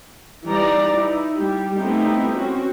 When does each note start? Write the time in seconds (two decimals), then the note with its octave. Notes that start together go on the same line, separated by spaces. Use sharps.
0.46 E3 G3 D#4 D5 A#5
0.93 D#4 E4
1.38 G3
1.77 G3 A3 B3 C4 D#4 E4
2.35 C4 C#4 F#4